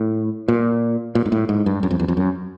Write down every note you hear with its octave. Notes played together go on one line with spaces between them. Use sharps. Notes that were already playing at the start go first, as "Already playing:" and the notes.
Already playing: A2
A#2
A#2
G#2
A2
G#2
G2
F#2
F2
E2
F2
F#2